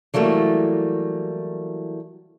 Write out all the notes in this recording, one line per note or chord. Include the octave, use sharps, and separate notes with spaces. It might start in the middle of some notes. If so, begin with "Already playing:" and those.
E3 F#3 G3 A3 A#3